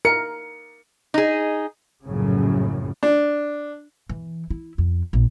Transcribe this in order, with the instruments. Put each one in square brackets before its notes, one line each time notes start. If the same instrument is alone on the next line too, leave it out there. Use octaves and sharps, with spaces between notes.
[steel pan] A#4 [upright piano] C#7
[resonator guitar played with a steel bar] D#4 G#4
[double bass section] A#1 F#2 A2 C#3
[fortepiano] D4
[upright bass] E3
E4
F2
A#1